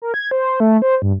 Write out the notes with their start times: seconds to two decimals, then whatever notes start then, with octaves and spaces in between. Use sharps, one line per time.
0.02 A#4
0.14 G#6
0.31 C5
0.60 A3
0.82 C5
1.02 G2